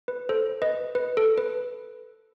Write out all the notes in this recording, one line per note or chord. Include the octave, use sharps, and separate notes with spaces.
B4
A4 C5
B4 D#5
B4
A4
B4